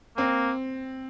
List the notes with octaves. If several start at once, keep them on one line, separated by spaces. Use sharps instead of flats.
A#3 C4